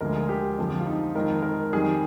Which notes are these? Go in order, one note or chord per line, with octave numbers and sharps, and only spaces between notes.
D2 D3 F3 G#3 A#4
G#4
G4
F2 D3 F3
F4
D#4
F2 D#3 G#3 A#4
A#4
F2 D#3 G3 G#4